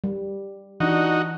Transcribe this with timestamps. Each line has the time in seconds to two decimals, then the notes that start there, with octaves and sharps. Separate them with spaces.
0.04 G3
0.80 E3 D4 D#4 F#4